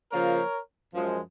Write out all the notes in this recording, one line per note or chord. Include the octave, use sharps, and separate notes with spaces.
C#3 F3 A#3 F4 A#4 C#5
F#2 F3 G#3